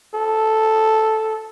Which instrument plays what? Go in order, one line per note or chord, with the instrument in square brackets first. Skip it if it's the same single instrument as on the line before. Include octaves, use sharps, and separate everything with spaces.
[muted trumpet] A4